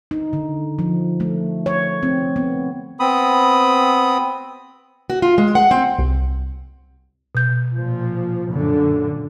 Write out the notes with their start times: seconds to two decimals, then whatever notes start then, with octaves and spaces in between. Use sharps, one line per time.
0.11 D#4
0.33 D3
0.79 F3
1.20 A3
1.66 C#5
2.03 C4
2.36 B3
3.00 B3 C4 B5 D#6
5.10 F#4
5.22 F4
5.38 G#3
5.55 F#5
5.71 C4
5.98 C2
7.35 B2 G6
7.75 A#2 F3
8.49 F#2 A#2 D3